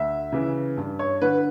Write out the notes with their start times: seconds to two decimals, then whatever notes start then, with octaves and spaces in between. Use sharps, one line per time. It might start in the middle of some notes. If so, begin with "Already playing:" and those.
Already playing: D2 E5
0.32 C#3 E3
0.77 G2
0.99 C#5
1.22 D3 B4